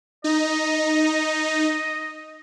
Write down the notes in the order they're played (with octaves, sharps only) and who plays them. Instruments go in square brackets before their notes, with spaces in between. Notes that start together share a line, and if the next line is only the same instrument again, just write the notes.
[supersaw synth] D#4 [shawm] D#5